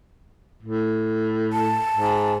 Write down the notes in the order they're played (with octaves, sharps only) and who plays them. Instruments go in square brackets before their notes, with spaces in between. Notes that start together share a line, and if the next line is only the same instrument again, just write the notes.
[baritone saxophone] A2
[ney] A5
[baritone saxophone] G#2